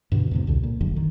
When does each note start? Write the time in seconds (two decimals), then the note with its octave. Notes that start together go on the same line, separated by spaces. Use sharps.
0.12 G2 B2 D3
0.31 E2 A2 C3
0.47 C2 B2 D3
0.63 A#2
0.81 F1 A#1 F#2 D3
0.96 D#3